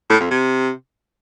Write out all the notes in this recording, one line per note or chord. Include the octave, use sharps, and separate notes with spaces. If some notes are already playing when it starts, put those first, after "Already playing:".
A2
F2
C3